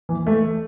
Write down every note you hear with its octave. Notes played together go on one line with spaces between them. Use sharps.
E3
A3